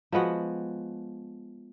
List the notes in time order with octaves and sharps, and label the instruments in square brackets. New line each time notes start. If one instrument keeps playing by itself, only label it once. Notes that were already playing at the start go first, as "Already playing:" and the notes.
[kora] F3 G#3 B3 F#4